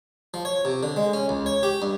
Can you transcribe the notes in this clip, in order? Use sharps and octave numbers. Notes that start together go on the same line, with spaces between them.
F3
C#5
C3
D3
G#3
C#4
C#2
C#5
G4
G2